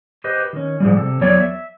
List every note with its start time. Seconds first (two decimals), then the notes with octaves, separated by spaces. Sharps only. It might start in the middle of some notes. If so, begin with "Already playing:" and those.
0.24 G4 B4 C5 D#5
0.53 D#3 C#4
0.80 G#2 F3 G3
0.97 C3 A4
1.21 E2 F#3 C#5 D5
1.40 E5